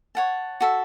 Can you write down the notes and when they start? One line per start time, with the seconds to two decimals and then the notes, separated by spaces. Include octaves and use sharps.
0.15 C#5 F#5 A5
0.61 F#4 A4 E5